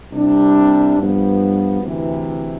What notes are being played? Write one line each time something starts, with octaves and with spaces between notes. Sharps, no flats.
C2 C3 G3 D4
G2 F3 B3
D2 C3 E3